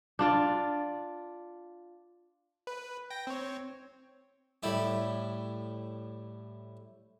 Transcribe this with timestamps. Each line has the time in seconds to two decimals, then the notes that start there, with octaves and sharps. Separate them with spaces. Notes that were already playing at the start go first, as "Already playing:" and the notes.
0.19 D4 F4 D5
2.67 B4
3.10 G5 A#6
3.27 C4 C#5
4.63 A2 G3 E4 G4